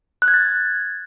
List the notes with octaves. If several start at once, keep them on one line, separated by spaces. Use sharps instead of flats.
F#6
G#6
A6